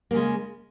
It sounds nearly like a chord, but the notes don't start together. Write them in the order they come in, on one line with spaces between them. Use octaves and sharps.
A#3 C#3 G#3